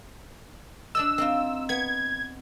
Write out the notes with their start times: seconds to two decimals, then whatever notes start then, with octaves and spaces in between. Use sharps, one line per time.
0.95 D4 D5 D#5 E6
1.18 C4 D#4 F4
1.69 B3 G#6